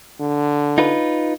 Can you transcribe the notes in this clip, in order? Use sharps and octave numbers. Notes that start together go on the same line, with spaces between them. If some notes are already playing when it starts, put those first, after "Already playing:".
D3
D#4 F4 B4